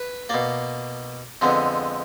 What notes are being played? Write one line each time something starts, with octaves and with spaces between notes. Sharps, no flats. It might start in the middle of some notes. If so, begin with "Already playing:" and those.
Already playing: B4
B2 A#3 D5
F2 D3 G#3 B3